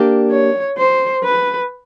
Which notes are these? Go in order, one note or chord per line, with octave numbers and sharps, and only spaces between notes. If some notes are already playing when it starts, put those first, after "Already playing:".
Already playing: A#3 D4 G4
C#5
C5
B4